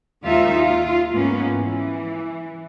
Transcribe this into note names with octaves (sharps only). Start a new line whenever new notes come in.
D#2 D#3 G#3 D#4 F4 E5
F4
G#2 G#3 A#3 B3 C#4
E3